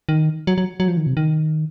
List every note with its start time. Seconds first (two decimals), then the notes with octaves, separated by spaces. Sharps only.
0.09 D#3
0.47 F#3
0.58 F#3
0.80 F#3
0.88 F3
0.97 D#3
1.07 C3
1.17 D#3